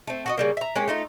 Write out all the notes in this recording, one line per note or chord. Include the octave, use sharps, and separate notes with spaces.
A3 C4
F#4 A4 D#5
C#3 G3 A#3
E5 A#5
G#3 A#3 C#4 G4
A3 D#4 F4